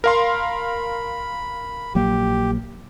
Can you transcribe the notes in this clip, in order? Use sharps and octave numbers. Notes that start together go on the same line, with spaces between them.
A#4 F5 B5 C6
A#1 F#3 A#3 G4